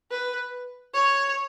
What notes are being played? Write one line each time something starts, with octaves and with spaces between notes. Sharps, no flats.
B4
C#5